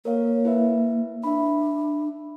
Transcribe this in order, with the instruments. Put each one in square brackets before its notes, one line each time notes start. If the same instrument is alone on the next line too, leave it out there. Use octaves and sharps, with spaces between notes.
[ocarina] A#3 [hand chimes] A#4 C#5 F5
[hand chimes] E4 B4 E5
[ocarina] D4 [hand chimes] E5 B5